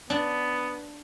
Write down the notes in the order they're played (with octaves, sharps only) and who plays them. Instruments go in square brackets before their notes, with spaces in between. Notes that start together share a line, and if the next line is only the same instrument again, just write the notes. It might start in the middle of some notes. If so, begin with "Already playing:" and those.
[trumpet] B3 [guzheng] D4